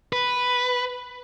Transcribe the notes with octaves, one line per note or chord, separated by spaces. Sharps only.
B4